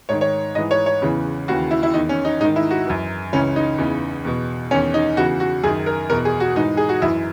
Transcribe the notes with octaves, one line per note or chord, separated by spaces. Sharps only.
G#2 D#3 C#5
C#5
G#2 E3 D#5
C#5
C#5
E2 C#3 E3
D#2 C#3 E3 F#4
E4
E4
E2 D#3 D#4
C#4
D#4
G#2 D#3 D#4
E4
F#4
F#2 E3
C#2 C#3 E3 C#4
D#4
E2 C#3 E3
E2 B2
E2 D#3 C#4
D#4
E2 C#3 E3 F#4
F#4
F#2 D#3 G#4
A#4
E2 B2 A#4
G#4
F#4
G#2 E3 D#4
G#4
F#4
F#2 E3 E4